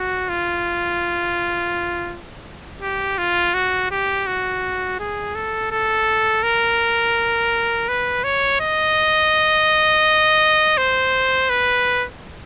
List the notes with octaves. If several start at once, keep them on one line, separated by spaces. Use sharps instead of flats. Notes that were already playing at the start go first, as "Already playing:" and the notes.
Already playing: F#4
F4
G4
F4
F#4
G4
F#4
G#4
A4
A4
A#4
B4
C#5
D#5
C5
B4